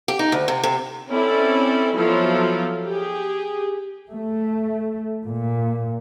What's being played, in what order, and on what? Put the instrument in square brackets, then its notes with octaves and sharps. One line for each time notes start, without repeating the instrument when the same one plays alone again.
[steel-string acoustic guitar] G4
D#4
D2
C3
C3
[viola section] C4 C#4 E4 A4 D5
F3 F#3 B3 E4 F4 A4
G4 G#4
[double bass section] A3
A#2